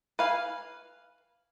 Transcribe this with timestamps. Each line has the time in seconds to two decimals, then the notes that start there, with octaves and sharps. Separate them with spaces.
0.19 B4 F5 G#5